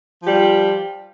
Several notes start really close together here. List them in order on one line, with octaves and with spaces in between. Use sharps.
F3 G4 G3 F4